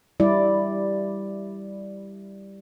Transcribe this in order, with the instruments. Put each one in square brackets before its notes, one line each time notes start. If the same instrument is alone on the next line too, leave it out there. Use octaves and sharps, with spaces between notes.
[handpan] G3 E4 D5